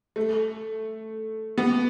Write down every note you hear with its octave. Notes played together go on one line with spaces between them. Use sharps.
A3
B3